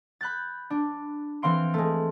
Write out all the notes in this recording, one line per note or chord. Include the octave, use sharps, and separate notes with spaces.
B5 F#6 G6 A6
D4
E3 C4 F5 C6 D7
G#3 A3